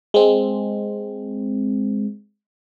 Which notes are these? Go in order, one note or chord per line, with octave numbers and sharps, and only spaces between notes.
G#3 C4